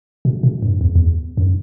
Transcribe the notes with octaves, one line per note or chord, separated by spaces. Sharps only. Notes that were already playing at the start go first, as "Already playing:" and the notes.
B2
B2
G2
E2
E2
F#2